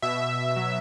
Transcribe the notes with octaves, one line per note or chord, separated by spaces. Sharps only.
B2 E5
B2
B2
F#3